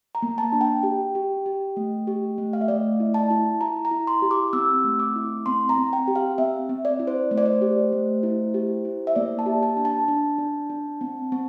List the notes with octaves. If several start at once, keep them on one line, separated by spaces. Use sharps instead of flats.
A#5
A#3
A5
D4
G5
G4
G4
G4
A3
G4
A3
F5
E5
A3 D5
E4
A5
E4
E4 A#5
A#5
E4
C6
G4
D6
C4 E6
A3
D6
E4
C4 C6
A#5
C4
G5
G4
F5
C4 E5
C4
D5
E4
C5
A3 C5
D5
C5
G4
A3
E4
G4
E4
E5
A#3 D5
A5
G4
A5
D4
A5
D4
D4
D4
C4
C4